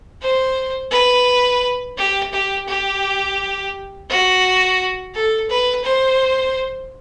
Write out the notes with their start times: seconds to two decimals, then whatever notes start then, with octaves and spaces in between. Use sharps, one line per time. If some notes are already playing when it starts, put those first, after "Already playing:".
0.22 C5
0.91 B4
1.97 G4
2.33 G4
2.68 G4
4.09 F#4
5.14 A4
5.49 B4
5.84 C5